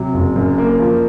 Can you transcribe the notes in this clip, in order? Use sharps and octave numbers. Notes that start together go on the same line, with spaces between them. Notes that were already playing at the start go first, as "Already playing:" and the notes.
Already playing: C3 F#3
F#1
F#2
A#3
F3